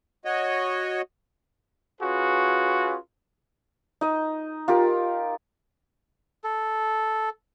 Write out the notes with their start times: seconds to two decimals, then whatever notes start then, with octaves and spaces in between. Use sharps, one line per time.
0.25 F#4 C#5 D#5
2.01 C#4 F4 F#4 G#4 B4
4.01 D#4 D#5
4.68 F4 G4 A#4
6.44 A4